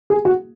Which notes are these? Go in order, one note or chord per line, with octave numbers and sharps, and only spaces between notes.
G#4
F#4